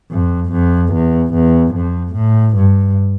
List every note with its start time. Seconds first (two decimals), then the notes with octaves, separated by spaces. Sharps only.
0.11 F2
0.52 F2
0.93 E2
1.34 E2
1.74 F2
2.15 A2
2.56 G2